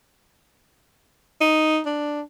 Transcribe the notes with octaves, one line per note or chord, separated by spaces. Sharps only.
D#4
D4